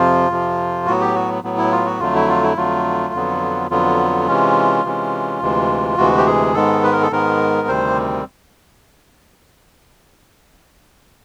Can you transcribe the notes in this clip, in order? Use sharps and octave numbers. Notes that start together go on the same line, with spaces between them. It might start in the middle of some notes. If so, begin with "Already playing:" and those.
Already playing: F2 C3 F3 F4
F2 C3 F3
A2 F#3 B3 F#4
G4
F#4
A2 F#3 B3
E4
F4
F#4
F2 D3 F#3 A3 F4
E4
F4
E4
F2 D3 F#3 A3 F4
F2 D3 F#3 B3
F2 D3 F#3 B3 F4
C3 E3 G#3 C#4
C3 E3 G#3 C#4
D2 C3 E3 G#3
D2 C3 E3 G#3 F#4
G4
G#4
G#2 D#3 G#3 B3 A4
B4
A#4
A4
G#2 D#3 G#3 B3 A#4
D2 C3 D#3 G3 C4 C5